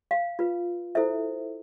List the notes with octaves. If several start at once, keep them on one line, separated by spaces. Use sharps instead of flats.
F5
F4 B4
E4 A4 C5 E5